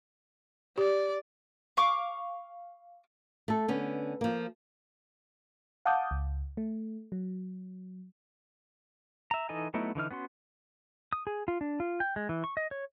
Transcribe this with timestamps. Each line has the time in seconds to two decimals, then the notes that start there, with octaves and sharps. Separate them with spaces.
0.78 G4 D5
1.77 F5 C#6 D6
3.48 A3 A4
3.68 D3 B3 C#4
4.21 F3 A#3
5.85 F5 F#5 A5 D6 D#6 G6
6.11 C#2
6.57 A3
7.12 F#3
9.31 E5 A#5
9.49 E3 D#4 A4 D#5 G#5
9.74 F#3 A3 B3 D#4 E4
9.95 D3 E3 D#4 F6
10.11 B3 C#4 F#4 C6
11.13 D#6
11.27 G#4
11.48 F4
11.61 D4
11.80 F4
12.00 G5
12.16 G#3
12.29 E3
12.44 C#6
12.57 D#5
12.71 C#5